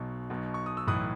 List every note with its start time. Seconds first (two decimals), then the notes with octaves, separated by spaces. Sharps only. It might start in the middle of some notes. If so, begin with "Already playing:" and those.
Already playing: B1 B2
0.30 B1 B2
0.54 C#6
0.66 D#6
0.77 E6
0.87 B1 A2 E3 D#6 F#6